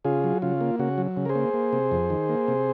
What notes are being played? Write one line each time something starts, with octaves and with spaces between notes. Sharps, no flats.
C#3 F4 G#4
F#3
C#3 F4
A#3
C#3 F#4
F#3
C#3
A#4
G#4 C5
A#3
A#3
C3
F2
D#3
A#3
C3